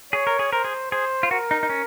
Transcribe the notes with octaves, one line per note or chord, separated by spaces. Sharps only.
G#4 C#5
A#4
G#4
A#4 C5
G#4
G#4 C5
F4
F#4 A#4
D#4
D#4
C#4